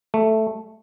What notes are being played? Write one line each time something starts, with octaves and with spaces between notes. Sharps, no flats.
A3